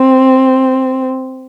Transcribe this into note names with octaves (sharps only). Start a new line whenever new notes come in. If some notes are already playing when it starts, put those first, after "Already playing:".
Already playing: C4